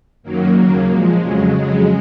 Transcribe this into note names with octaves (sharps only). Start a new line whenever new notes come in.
F#2 D#3 F#3 A#3
D#2 C#3 F#3
A#2 F3 G#3
F2 C#3 F#3
F2 C#3 F#3 G#3